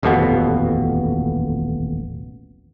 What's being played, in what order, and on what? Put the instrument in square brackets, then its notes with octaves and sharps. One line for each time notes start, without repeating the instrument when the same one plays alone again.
[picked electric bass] D#1 A1 F2 B2